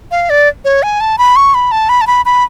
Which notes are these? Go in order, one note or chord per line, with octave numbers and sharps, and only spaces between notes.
F5
D5
C#5
G#5
A5
B5
C#6
B5
A5
B5
A5
B5
B5